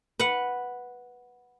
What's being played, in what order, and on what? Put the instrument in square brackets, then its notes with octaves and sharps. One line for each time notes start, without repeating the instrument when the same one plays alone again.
[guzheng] B4 F#5